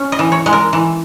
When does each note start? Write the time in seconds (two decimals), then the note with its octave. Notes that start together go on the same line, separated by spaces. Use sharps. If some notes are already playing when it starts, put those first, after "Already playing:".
Already playing: C#4
0.12 D#5
0.19 E3
0.32 C#5
0.46 G#3
0.53 A#4
0.73 E3